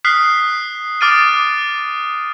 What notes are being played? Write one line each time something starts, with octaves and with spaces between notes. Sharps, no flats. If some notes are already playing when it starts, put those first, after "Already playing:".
D#6 F6 F#6 B6 C7
D6 D#6 F6 A6 D7 D#7